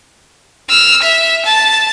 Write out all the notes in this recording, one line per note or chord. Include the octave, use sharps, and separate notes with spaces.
E6 F6
E5
A5